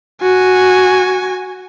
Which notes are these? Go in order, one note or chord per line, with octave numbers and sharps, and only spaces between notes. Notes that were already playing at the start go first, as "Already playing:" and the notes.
F#4 G#5